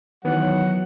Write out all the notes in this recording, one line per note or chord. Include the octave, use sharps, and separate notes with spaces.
D#3 E3 F#3 B3 F#5